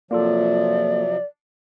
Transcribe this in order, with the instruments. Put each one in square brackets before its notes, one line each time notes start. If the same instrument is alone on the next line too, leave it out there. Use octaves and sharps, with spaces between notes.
[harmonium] C3 F3 F#3 [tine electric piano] A#3 F4 A4 [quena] D5